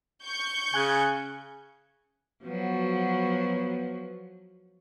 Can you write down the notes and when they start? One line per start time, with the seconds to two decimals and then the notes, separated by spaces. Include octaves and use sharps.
0.24 C#6 G6
0.74 C#3 G#5 F#6 G#6
2.44 F3 F#3 B3 F#4